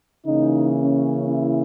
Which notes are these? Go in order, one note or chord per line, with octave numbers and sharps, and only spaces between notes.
C#3 E3 A#3 D#4
C#4
E4